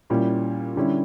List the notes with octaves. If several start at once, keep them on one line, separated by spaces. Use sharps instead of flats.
A#2 G3 C#4 E4
D3 G3 C#4 E4